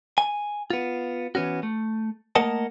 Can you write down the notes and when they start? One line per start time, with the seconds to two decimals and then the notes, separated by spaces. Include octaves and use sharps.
0.18 G#5
0.70 B3 F4
1.35 E3 B3 C#4 F#4
1.63 A3
2.35 A3 A#3 A#4 D#5 F#5 A5